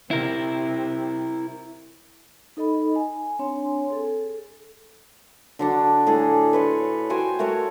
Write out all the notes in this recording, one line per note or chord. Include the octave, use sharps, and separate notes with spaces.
C3 E4 A#4
D#4 A4 D#5 B5
G#5
C4 D4 C#5 G#5 C6
G#4 A4
D3 F#3 D4
A2 G#4 A4
B4 C#5 C6
F#4 C5 G5 G#5
A3 F#4 A#4 C#5